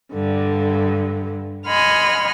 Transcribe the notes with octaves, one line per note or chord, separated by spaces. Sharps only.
G2 D3
D#5 F#5 G#5 B5 C6 F6